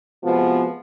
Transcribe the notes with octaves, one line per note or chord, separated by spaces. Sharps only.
C3 F3 G#3 B3 F4 F#4